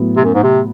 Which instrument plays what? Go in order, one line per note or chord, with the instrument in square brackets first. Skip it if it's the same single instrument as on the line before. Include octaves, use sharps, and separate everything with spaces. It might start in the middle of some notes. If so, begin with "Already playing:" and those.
Already playing: [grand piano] A2 F#3 B3
[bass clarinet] C3
F#2
G#2
C3